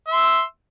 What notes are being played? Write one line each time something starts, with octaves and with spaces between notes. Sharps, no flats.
E5 C6 E6